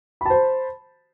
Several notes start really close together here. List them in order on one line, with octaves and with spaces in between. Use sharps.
B5 A5 C5